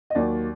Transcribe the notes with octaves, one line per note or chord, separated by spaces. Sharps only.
D#5
D#2 D#3 F#3 A#3 D5